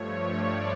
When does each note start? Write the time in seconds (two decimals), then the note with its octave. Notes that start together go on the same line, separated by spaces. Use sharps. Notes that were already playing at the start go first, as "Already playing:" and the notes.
Already playing: G2 F3 A3 C#5
0.33 D5